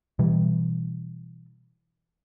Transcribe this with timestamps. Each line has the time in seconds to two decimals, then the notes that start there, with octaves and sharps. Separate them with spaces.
0.19 B2 E3 G3